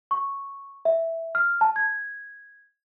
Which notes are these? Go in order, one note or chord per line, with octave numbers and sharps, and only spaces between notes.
C#6
E5
F6
A5
G#6